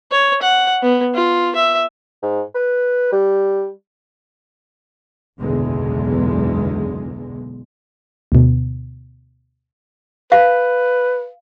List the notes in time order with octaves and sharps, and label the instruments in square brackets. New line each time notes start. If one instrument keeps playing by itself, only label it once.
[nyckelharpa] C#5
F#5
B3
F4
E5
[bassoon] G#2
B4
G3
[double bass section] F#1 B1 E2 D3 G#3
[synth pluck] D2 B2
[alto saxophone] B4 [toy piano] F5